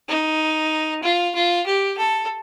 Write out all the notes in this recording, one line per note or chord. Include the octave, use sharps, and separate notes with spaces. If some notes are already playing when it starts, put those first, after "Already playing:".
D#4
F4
F4
G4
A4